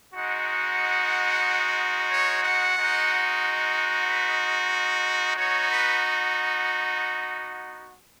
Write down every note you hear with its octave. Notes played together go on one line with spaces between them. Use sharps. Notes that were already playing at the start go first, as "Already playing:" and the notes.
G#3 D#4 F#4 F#5
F#5
C#5
F#5
G#3 D#4 F#4
F#5
F#5
B4
B3 D#4 F#4 C#5
B4